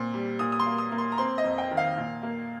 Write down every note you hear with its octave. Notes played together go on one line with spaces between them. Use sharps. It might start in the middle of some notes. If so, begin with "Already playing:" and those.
Already playing: A#2 C4
G3
A#2 D#6
D#6
C6
A#3
D#6
A#3
C6
A#5
C4 C6
D#5
F2
G5
D#3
F5
A#2
A#3